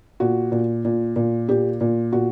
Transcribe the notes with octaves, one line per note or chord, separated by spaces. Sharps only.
A#2 F#4
A#2
A#2
A#2
A#2 G4
A#2
A#2 F#4